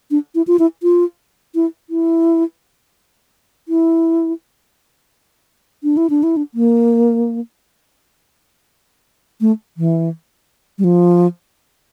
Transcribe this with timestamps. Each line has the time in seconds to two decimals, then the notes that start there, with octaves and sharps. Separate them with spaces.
0.11 D4
0.35 E4
0.47 F4
0.59 E4
0.83 F4
1.55 E4
1.90 E4
3.68 E4
5.84 D4
5.97 E4
6.10 D4
6.23 E4
6.37 D4
6.54 A#3
9.41 A3
9.77 E3
10.78 G3
10.84 F3